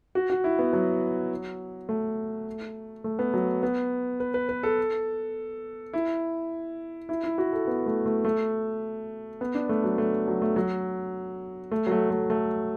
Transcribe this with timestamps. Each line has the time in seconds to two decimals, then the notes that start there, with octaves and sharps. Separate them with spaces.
0.15 F#4
0.30 F#4
0.44 E4
0.59 B3
0.73 F#3
1.89 A3
3.04 A3
3.19 B3
3.34 F#3
3.63 B3
4.20 B4
4.34 B4
4.49 B4
4.63 A4
5.93 E4
7.09 E4
7.24 E4
7.38 F#4
7.53 A4
7.67 B3
7.86 A3
8.06 A3
8.25 A3
9.41 B3
9.55 D4
9.69 A3
9.84 F#3
9.98 A3
10.28 F#3
10.42 A3
10.56 F#3
11.71 A3
11.87 F#3
11.91 A3
12.10 A3
12.30 A3